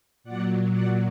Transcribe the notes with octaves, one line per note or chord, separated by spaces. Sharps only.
A#2 F#3 D5 F#5
D5 F#5